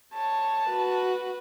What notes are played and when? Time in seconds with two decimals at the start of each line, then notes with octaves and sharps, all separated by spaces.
0.14 C#5 A5
0.69 F#4 B4